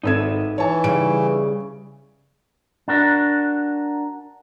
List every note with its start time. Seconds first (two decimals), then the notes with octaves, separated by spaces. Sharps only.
0.04 G#1 D#4 A4 B4 E5 G#6
0.58 E3 C#5 A5
0.84 C#3 G3 D7
2.88 D4 F#4 A#4